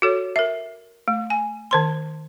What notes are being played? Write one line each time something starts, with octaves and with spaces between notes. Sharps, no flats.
F#4 A4 C#5
A#4 E5
A3
G#5
D#3 C5 C6